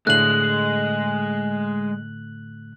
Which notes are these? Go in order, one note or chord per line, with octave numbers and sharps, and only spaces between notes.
A2 D3 G#3 A3 F#6 F#7